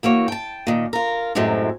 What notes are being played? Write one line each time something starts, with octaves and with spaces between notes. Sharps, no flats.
E3 A#3 F#4 C#5
G5 A5
A#2 D#3
F4 A#4
F#2 A2 C3 F#3 G#3 C4